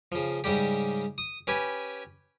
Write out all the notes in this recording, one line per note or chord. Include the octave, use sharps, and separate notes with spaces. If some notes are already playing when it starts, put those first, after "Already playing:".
C#3 F3
G#2 C#3 G3 G4
D#6
C#4 G4 B4 G#5